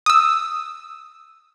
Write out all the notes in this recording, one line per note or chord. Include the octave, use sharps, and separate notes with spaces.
D#6 E6